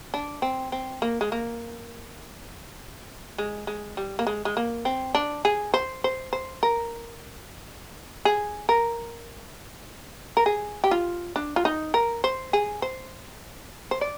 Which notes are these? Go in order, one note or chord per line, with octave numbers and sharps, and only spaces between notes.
D4
C4
C4
A#3
G#3
A#3
G#3
G#3
G3
A#3
G#3
G#3
A#3
C4
D4
G#4
C5
C5
C5
A#4
G#4
A#4
A#4
G#4
G4
F4
D4
F4
D#4
A#4
C5
G#4
C5
C5
D5